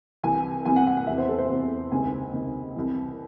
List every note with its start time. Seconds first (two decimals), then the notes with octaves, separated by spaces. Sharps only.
0.23 C2 C3 E3 G#5
0.65 C2 C3 E3 G#5
0.76 F#5
0.87 F#5
0.97 F#5
1.07 E2 C3 E3 E5
1.18 C5
1.29 A4
1.38 C5
1.49 E2 C3 E3
1.91 C#2 C3 D#3 G#5
2.33 C#2 C3 D#3
2.75 C2 C3 E3